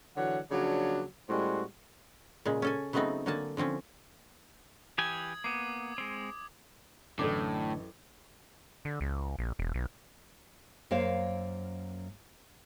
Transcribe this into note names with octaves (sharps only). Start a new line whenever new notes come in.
D3 E3 F#3 C#5 F#5
C#3 F3 F#3 A#3 D4
A2 G3 G#3 C#4 F#4 C5
A#2 C#3 G#3
C#4 A4 G#5
C#3 F#3 A3 B3 C4 D#4
D3 F#3 A#3 G#5 A5
D3 F3 C4 C#4
E3 G4 G#5 D#6 G#6
A#3 B3 D6
G#3 C4
A1 F#2 A2 D3 A4 D5 D6
D3
C#2
A#1
E1
B1
F#2 A#3 C5 C#5 F5